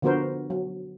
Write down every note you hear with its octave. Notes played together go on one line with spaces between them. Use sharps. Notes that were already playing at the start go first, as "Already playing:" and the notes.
D3 F3 B3 F#4 A#4 C5
F#3